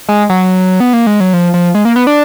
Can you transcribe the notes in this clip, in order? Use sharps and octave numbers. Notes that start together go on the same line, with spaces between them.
G#3
F#3
B3
A#3
G#3
F#3
F3
F3
G#3
A#3
B3
D4